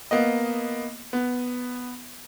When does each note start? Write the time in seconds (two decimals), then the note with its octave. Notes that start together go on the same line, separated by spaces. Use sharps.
0.11 A#3 B3 D#5
1.13 B3